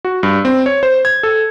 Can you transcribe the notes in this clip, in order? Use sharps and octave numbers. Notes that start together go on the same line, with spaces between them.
F#4
G2
C4
C#5
C5
G#6
A4